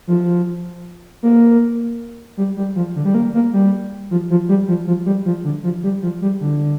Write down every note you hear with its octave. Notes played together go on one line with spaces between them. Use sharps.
F3
A#3
G3
G3
F3
D3
G3
A#3
A#3
G3
F3
F3
G3
F3
F3
G3
F3
D3
F3
G3
F3
G3
D3